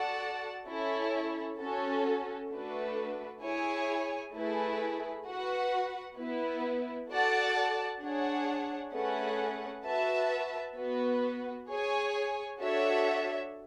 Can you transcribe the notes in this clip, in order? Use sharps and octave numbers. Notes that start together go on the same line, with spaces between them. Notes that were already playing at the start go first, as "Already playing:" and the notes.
Already playing: F#4 A4 D5 F#5 A5
C#4 E4 A4 C#5
C#4 F#4 A4
A3 D4 F#4 B4
E4 G#4 C#5 G#5
A3 E4 G#4 B4
F#4 B4 F#5
B3 E4 B4
F#4 A4 D5 F#5 A5
D4 G#4 C#5 F#5
A3 C#4 G#4 B4 F#5
F#4 B4 E5 A5
B3 F#4 B4
G#4 C#5 G#5
D4 F#4 A4 C#5 E5